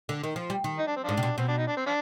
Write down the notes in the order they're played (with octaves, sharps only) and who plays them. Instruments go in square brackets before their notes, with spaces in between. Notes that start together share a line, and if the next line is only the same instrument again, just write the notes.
[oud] D3
D#3
F3
G3
D#3
[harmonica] D#4
D4
C4
[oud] G#2 [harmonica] F3 D4
[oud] C3
B2
[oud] B2 [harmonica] C4
[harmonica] D4
D#4
D4
C4
F3 D4